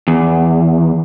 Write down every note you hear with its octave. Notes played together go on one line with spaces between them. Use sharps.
E2